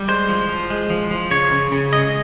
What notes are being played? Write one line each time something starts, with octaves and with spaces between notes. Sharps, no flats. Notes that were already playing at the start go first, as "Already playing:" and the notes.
Already playing: G3
G#3 C5
F3
F3
G#3
F3
F3
C#3 C#5
C#3
C#3
G#3 D#5